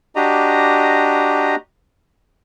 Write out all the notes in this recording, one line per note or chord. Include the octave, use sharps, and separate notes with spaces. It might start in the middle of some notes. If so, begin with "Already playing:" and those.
D4 F#4 G4 D#5 A#5